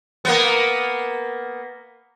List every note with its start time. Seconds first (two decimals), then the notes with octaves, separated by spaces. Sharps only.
0.25 A#3 B3